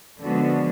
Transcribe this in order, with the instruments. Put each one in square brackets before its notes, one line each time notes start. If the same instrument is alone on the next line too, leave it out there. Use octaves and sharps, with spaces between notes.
[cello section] D3 F3 G#3 B3 D4 F#4